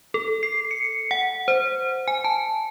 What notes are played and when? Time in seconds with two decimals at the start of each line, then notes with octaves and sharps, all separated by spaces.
0.14 A4
0.43 C7
0.71 C#7
1.11 F#5
1.48 C5
2.08 G#5
2.24 A5